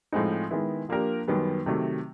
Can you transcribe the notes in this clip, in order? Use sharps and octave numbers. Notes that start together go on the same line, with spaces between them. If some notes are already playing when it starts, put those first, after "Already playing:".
A2 F3 G#3 C4 D#4
D#3 G#3 B3 E4
F3 A#3 D4 G4 A#4
F#2 D#3 G3 B3
C3 D#3 F#3 A3